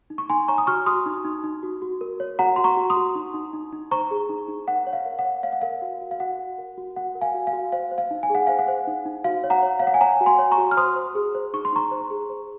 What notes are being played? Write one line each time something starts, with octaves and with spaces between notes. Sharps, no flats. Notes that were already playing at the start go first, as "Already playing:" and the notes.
D#4
C#6
D#4 G#5 C6
C#5 A#5 C#6
D#6
F#4 C#6 F6
F#4 C6 D#6
D#4
D#4
D#4
F#4
F#4
A#4
C#5
F#4 F#5 A#5
F#4 C6
A#5 C#6
F#4
C6 D#6
F#4
D#4
D#4
D#4
D#4
C5 A#5 C#6
G#4
D#4
D#4
A#4 F#5
C#5
F5
A#4
F#5
C#5
C#5 F5
F#5
A#4 F5
F#4
F#4
F5
F#4 F#5
F#4
A#4
F#4
F#4 F#5
A#4
F5 G#5
F#4
F5
F#4
C5 F5
C5
F5
D#4
G#5
G#4
F#5
C5 F5
F#5
C5
D#4
D#4
F#4 F5
C#5
F#5 A#5
C#5
C#5 F5
F#5
G#5
C#5 F#5 A#5
F#4
G#5 C6
C#5
A#5 C#6
F#4
F6
C5 C6 D#6
C5
G#4
C5
D#4 C#6
C6
D#4 A#5 C#6
C5
G#4
C5